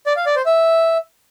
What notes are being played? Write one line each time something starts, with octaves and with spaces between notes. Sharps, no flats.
D5
F5
D5
C5
E5